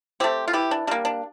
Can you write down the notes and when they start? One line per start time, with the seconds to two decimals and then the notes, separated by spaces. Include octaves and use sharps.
0.20 A3 C4 G4
0.48 F4
0.53 E3 G4
0.71 D4
0.87 G3 A#3 D4
1.05 D4